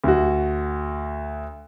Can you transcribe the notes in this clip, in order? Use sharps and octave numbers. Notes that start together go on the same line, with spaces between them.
D2 F#4